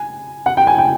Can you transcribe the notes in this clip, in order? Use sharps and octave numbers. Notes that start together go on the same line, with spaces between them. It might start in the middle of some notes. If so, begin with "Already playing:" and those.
Already playing: G#5
F#5
G5
G#5
G5